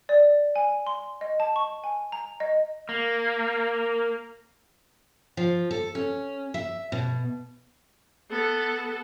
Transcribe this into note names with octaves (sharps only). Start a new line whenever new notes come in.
D5
G#5
C6
D#5
A5
C#6
G#5
A#5
D#5
A#3
F3
A4
C#4
E5
B2
B3 A4